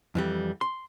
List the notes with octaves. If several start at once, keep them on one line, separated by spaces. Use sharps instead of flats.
F2 E3 G3
C6